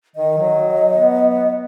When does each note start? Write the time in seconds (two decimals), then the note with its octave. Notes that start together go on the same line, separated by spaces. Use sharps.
0.16 D#3 D#5
0.37 F#3
0.93 B3